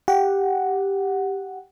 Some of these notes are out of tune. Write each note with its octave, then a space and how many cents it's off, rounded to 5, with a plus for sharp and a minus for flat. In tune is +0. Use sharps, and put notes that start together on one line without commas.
G4 +0 F#5 +0